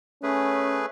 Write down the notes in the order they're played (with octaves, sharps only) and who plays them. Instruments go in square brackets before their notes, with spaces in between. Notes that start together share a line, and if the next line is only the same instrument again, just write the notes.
[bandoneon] A3 G#4 B4 [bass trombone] C#4